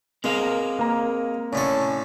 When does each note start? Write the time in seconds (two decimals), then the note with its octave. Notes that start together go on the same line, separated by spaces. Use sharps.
0.24 G#3 C4 A#4 F5
0.79 A#3 A#5
1.53 A2 D3 C#4 A4